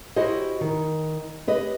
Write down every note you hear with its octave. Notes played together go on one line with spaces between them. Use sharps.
E4 F#4 G4 C5 D#5
D#3
G4 B4 D#5